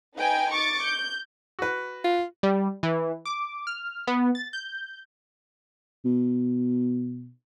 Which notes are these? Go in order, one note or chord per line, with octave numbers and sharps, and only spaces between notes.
D#4 B4 G5 G#5
C#6 D6 A6
G6
F#4 B4
F4
G3
E3
D6
F6
B3
A6
G6
B2